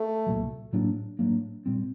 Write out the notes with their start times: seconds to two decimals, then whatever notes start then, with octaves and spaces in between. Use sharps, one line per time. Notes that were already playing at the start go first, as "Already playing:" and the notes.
Already playing: A3
0.26 C2 A#2 F#3
0.73 A2 F#3 A#3 D4
1.19 A2 F#3 A#3 D4
1.66 A#2 G3 C4